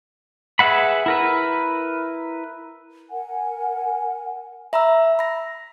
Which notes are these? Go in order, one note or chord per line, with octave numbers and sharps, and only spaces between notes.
G#4 B4 E5 F#5 B5
E4 A#4 B4
A#4 F#5 G#5
E5 A#5 B5 E6
B5 A#6